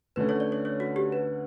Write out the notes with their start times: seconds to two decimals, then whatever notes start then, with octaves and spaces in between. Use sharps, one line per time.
0.16 D2 D3 A3 C#4 B4
0.29 C#5
0.40 D5
0.52 C#5
0.65 C#5
0.80 F#4
0.96 G4
1.12 B4